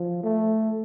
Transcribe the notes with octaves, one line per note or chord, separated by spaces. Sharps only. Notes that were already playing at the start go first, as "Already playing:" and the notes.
Already playing: F3
A3